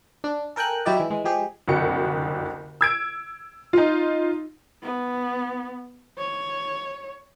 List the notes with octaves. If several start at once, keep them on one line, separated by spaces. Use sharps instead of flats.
D4
A4 A#4 G5 G#5 F#6
F#3 E4 G4 D5 D#5
E3 G#3 E4
E3 G#3
F3 G#3 G4 G#4
F#1 C2 F2 D3 F#4 C#7
E6 G#6 D7
D#4 F4
B3
C#5